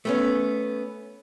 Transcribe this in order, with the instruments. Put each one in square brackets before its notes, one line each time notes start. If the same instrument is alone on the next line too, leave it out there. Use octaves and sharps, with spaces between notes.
[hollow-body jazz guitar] A3 B3 C#4